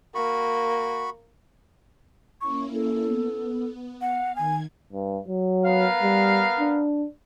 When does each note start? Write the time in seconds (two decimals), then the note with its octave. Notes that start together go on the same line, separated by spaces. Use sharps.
0.15 A#3 F#4 B5 C#6
2.41 A#3 C#4 E4 C#6
2.74 A4
3.04 B3
4.01 F5 F#5
4.36 D#3 G#5 G#6
4.93 G2
5.28 F#3
5.66 B3 A#4 F5
6.02 G3
6.60 D4